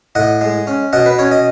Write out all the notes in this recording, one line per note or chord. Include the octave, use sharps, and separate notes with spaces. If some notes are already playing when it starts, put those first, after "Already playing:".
A2 D#5 F#5
G#3
C#4
B2 D#5 F#5
B4
C#4 C#5
D#5